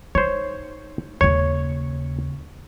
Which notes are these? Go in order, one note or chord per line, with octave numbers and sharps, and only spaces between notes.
D#4 C5 C#5
D#2 C#3 C#5